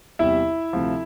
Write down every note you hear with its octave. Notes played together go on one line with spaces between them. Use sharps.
E2 C3 G3 E4 E5
D2 C3 F3